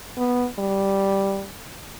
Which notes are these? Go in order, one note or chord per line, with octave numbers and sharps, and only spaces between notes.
B3
G3